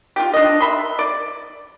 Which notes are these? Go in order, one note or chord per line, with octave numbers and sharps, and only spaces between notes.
F4 G4
D4 D#5
E5 B5 C6
D5